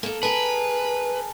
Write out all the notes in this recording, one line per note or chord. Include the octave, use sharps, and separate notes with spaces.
A#3 A4
G#4 A#4 B4 A5